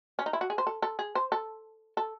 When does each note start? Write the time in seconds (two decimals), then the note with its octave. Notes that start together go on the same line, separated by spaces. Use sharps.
0.19 C#4
0.26 D#4
0.33 E4
0.41 F#4
0.50 G#4
0.58 C5
0.67 A4
0.82 A4
0.99 G#4
1.15 C5
1.32 A4
1.97 A4